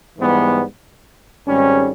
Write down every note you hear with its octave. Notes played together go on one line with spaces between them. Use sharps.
G#2 E3 G3 B3
G#1 G#2 G3 C#4